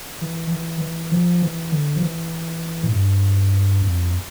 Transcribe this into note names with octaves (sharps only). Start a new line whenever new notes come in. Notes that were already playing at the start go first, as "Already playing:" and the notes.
E3
E3
E3
F3
E3
D3
F3
E3
A2
G2
F2